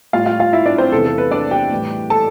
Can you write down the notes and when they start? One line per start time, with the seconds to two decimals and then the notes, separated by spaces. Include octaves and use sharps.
0.13 A2 G3 F4 F5
0.26 F4 F5
0.39 F4 F5
0.53 E4 E5
0.66 D4 D5
0.78 C4 C5
0.92 E2 C3 E3 A4
1.05 A4
1.18 B4
1.31 D4 D5
1.51 G4 G5
1.71 A2 E3 G3
2.10 A4 A5